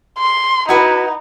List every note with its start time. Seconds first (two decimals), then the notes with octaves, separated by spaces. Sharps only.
0.19 C6
0.69 D#4 E4 F#4 B4